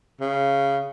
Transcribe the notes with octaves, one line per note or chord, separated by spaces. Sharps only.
C#3